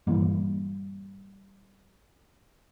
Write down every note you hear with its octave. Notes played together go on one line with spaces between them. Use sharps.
G2 A#2 E3 G3 A#3